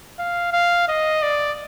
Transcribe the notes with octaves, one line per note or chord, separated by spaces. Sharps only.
F5
F5
D#5
D5